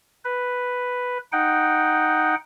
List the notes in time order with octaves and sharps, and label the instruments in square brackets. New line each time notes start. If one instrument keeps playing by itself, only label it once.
[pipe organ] B4
D#4 F#5 G5